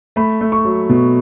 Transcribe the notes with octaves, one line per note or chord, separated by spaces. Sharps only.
A3 B5
A3
C#6
F#3
B2